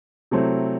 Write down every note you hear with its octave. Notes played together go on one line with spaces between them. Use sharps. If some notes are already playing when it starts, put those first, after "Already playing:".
C3 F#3 A3 C4 E4